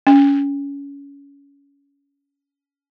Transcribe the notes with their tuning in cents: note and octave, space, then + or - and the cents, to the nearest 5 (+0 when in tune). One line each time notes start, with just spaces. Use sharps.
C#4 +25